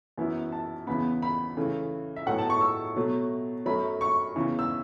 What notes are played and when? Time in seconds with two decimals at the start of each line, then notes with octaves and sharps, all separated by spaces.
0.18 F#2 E3 B3 E4
0.52 A5
0.87 E2 C#3 E3 B3 B5
1.22 B5
1.57 C#3 E3 A3
2.16 E5
2.26 A2 F#3 B3 E4 F#5
2.38 A5
2.50 C#6
2.61 E6
2.96 B2 F#3 A3
3.66 F#2 F#3 A3 B5
4.01 C#6
4.36 E2 C#3 E3
4.59 E6